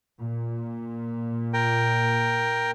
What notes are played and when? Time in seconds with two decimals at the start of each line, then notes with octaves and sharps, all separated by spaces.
0.21 A#2
1.53 A#4 G5